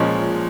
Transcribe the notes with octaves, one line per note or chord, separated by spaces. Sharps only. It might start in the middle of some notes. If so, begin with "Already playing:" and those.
Already playing: A#2 F3 G#3 C#4